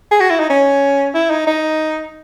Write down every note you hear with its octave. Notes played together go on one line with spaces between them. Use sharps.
G#4
F#4
E4
D#4
C#4
E4
D#4
D#4